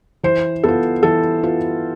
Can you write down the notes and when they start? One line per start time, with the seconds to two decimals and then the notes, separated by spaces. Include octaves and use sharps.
0.23 E3 C5
0.64 B3 F4 A4
1.03 E3 A4
1.43 B3 F4